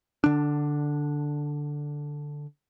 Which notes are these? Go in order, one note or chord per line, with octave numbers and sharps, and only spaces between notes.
D3 D4